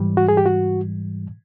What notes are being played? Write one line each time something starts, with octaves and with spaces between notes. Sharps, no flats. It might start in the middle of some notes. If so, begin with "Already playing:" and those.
Already playing: G#2 E3 G3
F#4
G#4
G4
F#4